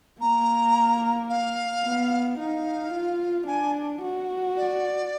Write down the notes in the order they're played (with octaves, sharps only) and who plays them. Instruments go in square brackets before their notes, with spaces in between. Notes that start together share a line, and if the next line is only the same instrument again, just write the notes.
[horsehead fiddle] A#3 [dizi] A#5
[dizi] F5
[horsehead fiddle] B3
[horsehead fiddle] D#4 [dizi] F5
[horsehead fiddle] F4
[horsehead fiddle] D4 [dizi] G#5
[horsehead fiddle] F#4
[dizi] D5